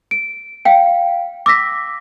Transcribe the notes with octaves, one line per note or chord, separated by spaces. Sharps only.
D7
F5 G5
D6 E6 A#6 B6